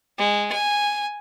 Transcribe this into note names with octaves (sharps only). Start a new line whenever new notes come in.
G#3
G#5